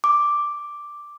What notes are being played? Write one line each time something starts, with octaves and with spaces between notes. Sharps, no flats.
D6